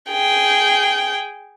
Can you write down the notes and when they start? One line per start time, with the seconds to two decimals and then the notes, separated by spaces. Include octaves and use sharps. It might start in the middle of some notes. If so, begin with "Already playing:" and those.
0.10 G#4 G5